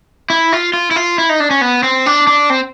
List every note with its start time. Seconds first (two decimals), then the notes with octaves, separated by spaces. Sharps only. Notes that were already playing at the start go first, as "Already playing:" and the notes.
0.30 E4
0.53 F4
0.73 F4
0.91 E4
0.96 F4
1.18 E4
1.29 D#4
1.40 D4
1.51 C#4
1.61 B3
1.83 C4
2.06 D4
2.27 D4
2.50 C4